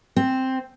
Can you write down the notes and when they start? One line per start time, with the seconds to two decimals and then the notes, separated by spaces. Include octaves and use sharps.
0.16 C4